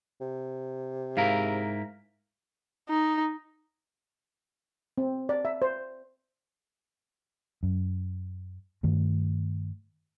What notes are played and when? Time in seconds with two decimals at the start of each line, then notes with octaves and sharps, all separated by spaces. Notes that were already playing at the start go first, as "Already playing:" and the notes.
0.21 C3
1.17 G#2 E4 A#4 F5
2.90 D#4
4.98 C4
5.29 D5
5.45 E5
5.62 C5
7.63 F#2
8.83 G2 D#3 A3